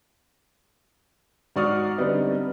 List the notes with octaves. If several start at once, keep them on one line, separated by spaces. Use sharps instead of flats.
G#2 F#4 D5 C#6 D#6 F6
D3 G3 B3 C4 D#4